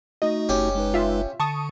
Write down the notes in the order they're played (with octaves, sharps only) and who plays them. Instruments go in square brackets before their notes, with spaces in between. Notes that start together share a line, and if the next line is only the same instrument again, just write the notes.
[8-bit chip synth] A3 D#4 F#4 [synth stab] D#5
[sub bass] F#1 [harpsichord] C#4 G4
[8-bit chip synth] G#3 D#4 B4
[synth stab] F4 E5
[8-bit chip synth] D3 [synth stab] A5 C#6 D#6